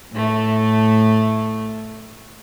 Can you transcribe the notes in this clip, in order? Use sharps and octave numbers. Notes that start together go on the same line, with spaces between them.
A2 A3